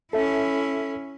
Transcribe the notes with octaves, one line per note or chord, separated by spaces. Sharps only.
C#4 E4 A4 E5